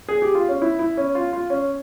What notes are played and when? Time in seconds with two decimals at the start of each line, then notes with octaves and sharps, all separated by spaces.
0.09 G#4
0.22 G4
0.35 F4
0.49 C#4
0.62 E4
0.79 E4
0.97 C#4
1.15 F4
1.33 F4
1.50 C#4